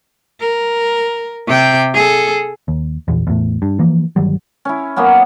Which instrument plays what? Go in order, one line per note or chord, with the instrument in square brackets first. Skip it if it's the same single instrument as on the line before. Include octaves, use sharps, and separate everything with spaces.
[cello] A#4
C3 G5
G#4 A4
[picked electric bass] D#2
A#1 E2
E2 A2
G2
E3 F3 A#3
G1 D#3 F#3 G3
[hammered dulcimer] C#4 E4
F#3 A#3 B3 C#4